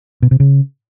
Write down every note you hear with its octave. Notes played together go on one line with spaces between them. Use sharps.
B2
C3
C#3